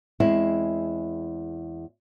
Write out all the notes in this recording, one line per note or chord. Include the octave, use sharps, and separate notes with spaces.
E2 G#3 C4 E4